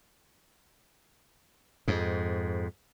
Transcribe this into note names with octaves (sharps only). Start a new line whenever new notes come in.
F2 G#2